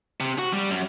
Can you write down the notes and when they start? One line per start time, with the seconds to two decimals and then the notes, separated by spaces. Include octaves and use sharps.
0.20 C3
0.38 F#4
0.53 G3
0.70 F#2